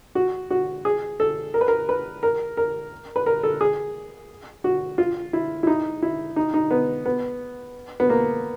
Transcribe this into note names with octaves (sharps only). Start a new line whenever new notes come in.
F#4
F#4
G#4
A4
A#4
B4
A#4
B4
A#4
A#4
B4
A#4
A4
G#4
F#4
F4
E4
E4
D#4
E4
D#4
D#4
B3
B3
B3
A#3